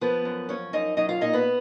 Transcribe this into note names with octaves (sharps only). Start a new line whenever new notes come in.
F3 B3 B4
F#2
F3 C#4 C#5
F#2 D#4 D#5
F#3 D#4 D#5
F4 F5
A#2 D#4 D#5
B3 B4